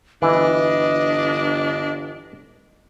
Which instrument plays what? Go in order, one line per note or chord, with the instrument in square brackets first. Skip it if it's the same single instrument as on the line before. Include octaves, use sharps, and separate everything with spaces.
[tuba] G1 [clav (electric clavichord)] E3 [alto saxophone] D4 [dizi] D#5